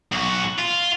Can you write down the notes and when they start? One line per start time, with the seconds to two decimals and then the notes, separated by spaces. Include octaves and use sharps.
0.12 B1 F#4
0.58 F4